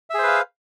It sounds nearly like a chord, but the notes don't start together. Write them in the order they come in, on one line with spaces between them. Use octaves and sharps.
E5 G#4 C5 B4 F5